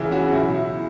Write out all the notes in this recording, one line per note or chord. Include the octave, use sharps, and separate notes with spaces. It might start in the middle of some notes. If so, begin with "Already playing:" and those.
Already playing: C#2 C#3 E3 E4 G#4
C#4 F#4
B1 B2 E4
E4